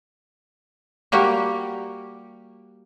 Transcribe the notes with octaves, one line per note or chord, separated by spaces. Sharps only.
G3 A#3 F#4 G4